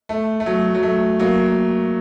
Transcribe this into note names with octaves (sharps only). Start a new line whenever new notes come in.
A3
A3
F#3
F#3
A3
F#3 A#3